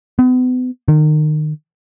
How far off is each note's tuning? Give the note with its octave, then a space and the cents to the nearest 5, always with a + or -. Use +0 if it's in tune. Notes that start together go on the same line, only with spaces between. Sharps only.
B3 +35
D#3 -30